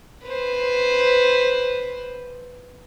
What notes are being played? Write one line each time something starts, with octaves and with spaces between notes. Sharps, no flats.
B4 C5